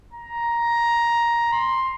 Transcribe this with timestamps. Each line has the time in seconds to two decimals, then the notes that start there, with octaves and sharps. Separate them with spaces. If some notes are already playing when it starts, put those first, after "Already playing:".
0.13 A#5
1.53 C6